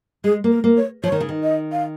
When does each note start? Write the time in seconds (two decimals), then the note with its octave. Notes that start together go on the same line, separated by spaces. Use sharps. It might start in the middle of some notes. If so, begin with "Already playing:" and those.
0.24 G#3 G#4
0.44 A#3
0.51 A#4
0.64 A#3
0.77 C#5
1.03 F3 C#5
1.12 D#3
1.20 C#3
1.29 D#3
1.43 D#5
1.72 F5